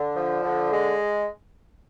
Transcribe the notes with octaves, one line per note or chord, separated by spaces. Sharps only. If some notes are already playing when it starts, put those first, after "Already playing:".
Already playing: D3
F3
D3
G#3